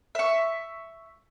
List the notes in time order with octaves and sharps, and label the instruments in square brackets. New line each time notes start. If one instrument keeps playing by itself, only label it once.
[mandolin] E5 C#6